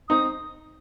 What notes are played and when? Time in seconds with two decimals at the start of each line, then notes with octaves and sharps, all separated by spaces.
0.09 C4 D#4 D#6